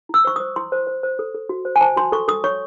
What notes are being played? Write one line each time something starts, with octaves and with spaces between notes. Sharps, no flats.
E4 E6
C5 C#6
D#6
C5
E4 C6
C5
C5
C5
A4
A4
F#4
C5
G#5
C5 A5
F#4 C6
A4 C#6
A4 D#6
C#5 C#6